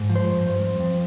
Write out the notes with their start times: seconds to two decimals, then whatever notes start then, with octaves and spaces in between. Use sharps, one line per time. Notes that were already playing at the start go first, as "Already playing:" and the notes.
Already playing: G#2
0.10 F3
0.16 C5
0.27 G2
0.45 G2
0.62 F2
0.80 F2